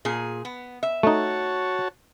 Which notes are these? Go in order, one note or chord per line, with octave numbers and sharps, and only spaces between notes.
A#2 G#4
B3
E5
A3 D#4 F#4 C#5 A5